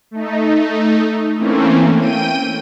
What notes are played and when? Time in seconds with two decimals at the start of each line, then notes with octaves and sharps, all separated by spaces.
0.11 A3 D#4
1.37 E3 A3 A#3 C4 C#4
1.98 G5 D#7